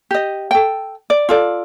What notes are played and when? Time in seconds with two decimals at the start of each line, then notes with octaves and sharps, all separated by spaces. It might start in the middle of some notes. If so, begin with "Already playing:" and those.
0.11 G4 D#5
0.51 A4 G5
1.10 D5
1.29 F4 A4 D5